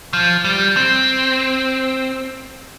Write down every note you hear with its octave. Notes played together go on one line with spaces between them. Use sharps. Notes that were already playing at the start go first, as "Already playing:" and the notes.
F3
G3
C4